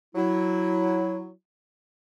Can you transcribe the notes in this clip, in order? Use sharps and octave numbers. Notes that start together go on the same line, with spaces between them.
F#3 E4